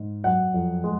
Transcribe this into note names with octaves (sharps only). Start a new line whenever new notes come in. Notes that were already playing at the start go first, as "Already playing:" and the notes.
Already playing: G#2
F#2 F#5
F2
G#3